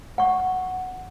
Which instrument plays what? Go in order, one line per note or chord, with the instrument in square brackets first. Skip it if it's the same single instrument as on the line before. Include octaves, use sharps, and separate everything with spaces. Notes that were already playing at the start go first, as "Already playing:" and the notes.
[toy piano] F#5 C#6